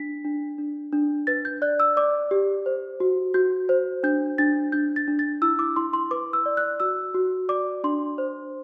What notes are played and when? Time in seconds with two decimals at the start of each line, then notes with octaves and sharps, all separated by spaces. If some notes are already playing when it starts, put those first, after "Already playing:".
Already playing: D4 B6
0.25 D4
0.58 D4
0.92 D4
1.27 B4 A6
1.45 G6
1.62 D5 F#6
1.80 E6
1.97 D5 D6
2.31 G4
2.66 C5
3.00 F#4
3.34 F#4 G6
3.69 C5
4.03 D4 G6
4.38 D4 A6
4.72 D4 G6
4.96 A6
5.08 D4
5.19 A6
5.42 E4 E6
5.59 D6
5.76 E4 C6
5.93 C6
6.11 B4 D6
6.33 E6
6.46 D5
6.57 F#6
6.80 F#4 E6
7.14 F#4
7.49 D5 D6
7.84 D4 C6
8.18 C5